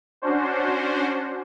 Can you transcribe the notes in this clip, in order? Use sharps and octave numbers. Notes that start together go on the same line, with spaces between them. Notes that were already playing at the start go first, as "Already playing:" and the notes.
C#4 D4 F#4 C5